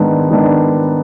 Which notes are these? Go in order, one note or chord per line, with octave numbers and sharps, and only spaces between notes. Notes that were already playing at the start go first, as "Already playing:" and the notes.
Already playing: G#2 D#3 B3 D4
G#2 D#3 B3 D4